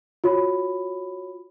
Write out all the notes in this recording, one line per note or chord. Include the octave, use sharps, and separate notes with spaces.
F4 F#4 C#5 B5